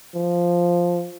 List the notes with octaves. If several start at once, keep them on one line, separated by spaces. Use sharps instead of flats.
F3